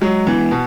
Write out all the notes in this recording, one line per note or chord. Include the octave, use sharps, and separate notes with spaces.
F#3 G#3
E3 B3
B2